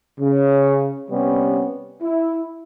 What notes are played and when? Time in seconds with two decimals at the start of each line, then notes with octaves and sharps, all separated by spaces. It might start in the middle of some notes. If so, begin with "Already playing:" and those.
0.19 C#3
1.11 C3 G3 B3 C#4
2.01 E4